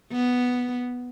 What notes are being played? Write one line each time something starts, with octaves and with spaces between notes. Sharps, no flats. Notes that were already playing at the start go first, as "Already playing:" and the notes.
B3